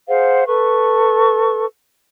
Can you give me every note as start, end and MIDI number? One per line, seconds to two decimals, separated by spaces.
0.08 0.45 68
0.08 0.45 72
0.08 0.45 77
0.08 0.45 78
0.46 1.65 69
0.46 1.65 71
0.46 1.65 85